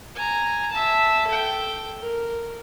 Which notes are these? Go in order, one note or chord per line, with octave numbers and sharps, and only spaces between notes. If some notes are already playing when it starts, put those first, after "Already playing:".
G#5 A#5
E5 A5
A4 G5
A#4